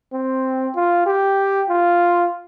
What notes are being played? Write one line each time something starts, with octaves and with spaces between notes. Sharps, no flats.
C4
F4
G4
F4